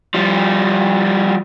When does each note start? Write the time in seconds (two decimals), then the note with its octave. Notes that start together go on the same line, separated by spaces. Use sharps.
0.14 F3 G3